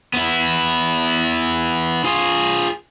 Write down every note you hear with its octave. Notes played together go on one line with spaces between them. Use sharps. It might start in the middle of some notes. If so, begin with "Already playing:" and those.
B3 E4
F4 G#4